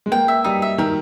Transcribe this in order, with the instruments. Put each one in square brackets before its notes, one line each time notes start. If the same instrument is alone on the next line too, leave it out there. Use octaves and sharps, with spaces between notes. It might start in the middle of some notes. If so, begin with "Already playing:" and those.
[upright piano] G#3
[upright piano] A#3 [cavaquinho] G5
[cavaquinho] E5
[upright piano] G3 [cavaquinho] D#4
[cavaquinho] E5
[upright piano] D#3 [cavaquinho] A#4